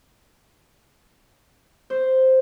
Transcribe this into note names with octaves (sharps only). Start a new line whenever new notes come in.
C5